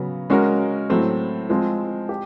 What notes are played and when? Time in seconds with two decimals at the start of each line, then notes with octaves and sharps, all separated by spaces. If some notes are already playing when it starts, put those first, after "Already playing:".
Already playing: C#3 F#3 B3
0.30 G#3 C#4 F#4 A#4
0.90 A2 F#3 A3 C4
1.49 F3 G#3 C4
2.09 G4